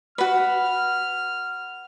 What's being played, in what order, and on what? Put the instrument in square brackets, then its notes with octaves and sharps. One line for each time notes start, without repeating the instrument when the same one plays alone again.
[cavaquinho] F#4 B4 [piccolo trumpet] F6